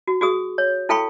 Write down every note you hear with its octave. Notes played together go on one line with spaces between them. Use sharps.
F#4
F#4 G#4 D#6
C#5
E4 A4 F5 G5 B5 C#6